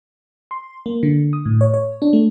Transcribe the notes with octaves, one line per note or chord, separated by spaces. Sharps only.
C6
A#3
D3
D#6
A2
C#5
C#5
D4
A3